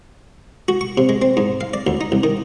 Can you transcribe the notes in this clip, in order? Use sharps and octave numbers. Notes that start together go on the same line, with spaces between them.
F#4
C#6
C3
G#3
C4
G#2
F5
D5
D2
D#4
C2
D#3